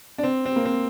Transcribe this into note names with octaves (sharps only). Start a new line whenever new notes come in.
D4
C4
C4
A#3
C4